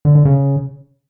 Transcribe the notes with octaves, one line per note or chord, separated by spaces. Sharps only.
D3
D3
C#3